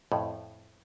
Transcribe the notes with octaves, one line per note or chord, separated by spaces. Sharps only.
F2 A2